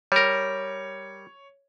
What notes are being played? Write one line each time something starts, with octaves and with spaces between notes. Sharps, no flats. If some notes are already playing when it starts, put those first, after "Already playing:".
G3 A#4 C#5